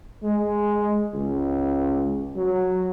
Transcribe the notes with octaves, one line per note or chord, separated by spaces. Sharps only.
G#3
C#2
F#3